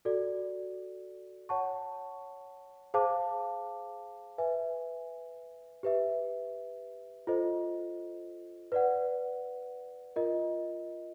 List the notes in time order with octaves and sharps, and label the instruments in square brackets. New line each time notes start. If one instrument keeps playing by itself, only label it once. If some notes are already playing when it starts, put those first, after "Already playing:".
[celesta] F#4 A4 D5
C#5 F#5 A5 C#6
G#4 C5 F5 A5 D6
B4 E5 G#5
G4 B4 E5
F4 A4 C5 D#5
B4 D5 F#5
F4 A#4 D#5